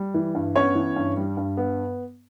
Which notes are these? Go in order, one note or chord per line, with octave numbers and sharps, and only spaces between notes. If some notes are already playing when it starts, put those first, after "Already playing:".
Already playing: G3
E3
G2
B3 C#4 C#5
E3
G2
G3
G2
B3